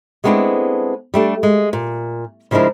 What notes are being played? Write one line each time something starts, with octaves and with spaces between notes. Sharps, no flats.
G#3 A3 B3 C4 D4 E4
G3 A3 D4
G#3
A#2
C#3 F3 G#3 D4 E4 A#4